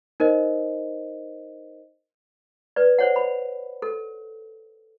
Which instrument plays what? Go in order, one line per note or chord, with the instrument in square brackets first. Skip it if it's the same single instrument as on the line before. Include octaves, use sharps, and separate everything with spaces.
[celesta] D#4 A#4 C5 D#5
[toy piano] B4 D5
C5 C#5 F#5
B5
A4